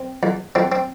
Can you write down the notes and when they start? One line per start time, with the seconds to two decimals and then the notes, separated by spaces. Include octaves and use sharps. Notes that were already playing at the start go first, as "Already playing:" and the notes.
Already playing: C4
0.23 E2
0.55 E2 C4
0.72 C4